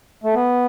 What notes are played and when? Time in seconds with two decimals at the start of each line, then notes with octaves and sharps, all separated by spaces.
0.24 A3
0.34 B3